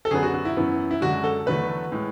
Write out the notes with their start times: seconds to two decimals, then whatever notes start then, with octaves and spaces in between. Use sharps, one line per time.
0.05 A4
0.11 F#2 D3 F#3 B3 G#4
0.23 F#4
0.34 F#4
0.45 E4
0.57 F#2 E3 B3
0.91 E4
1.01 F#2 D3 G#3 F#4
1.24 A4
1.46 E2 D3 F#3 A3 B4
1.92 A2 G#3